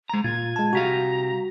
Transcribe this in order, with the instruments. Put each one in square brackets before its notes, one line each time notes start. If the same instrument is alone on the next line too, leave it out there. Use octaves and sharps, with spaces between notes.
[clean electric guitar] G#3 A#5
[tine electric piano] A#2 [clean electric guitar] F4 [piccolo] G#6
[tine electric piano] G#3 A5
[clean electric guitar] C2 G4 F5 [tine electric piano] F#4 [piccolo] A#5